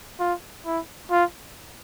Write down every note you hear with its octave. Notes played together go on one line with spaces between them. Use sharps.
F4
E4
F4